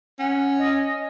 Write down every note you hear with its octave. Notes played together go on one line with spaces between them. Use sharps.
C#4 F#5
D#5